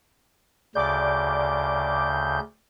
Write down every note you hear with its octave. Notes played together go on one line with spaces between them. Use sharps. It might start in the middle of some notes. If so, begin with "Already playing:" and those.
D2 C#3 D5 D6 G6